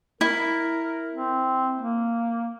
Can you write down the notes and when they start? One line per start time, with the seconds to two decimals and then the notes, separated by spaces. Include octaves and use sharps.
0.21 E4 A#4
1.12 C4
1.78 A#3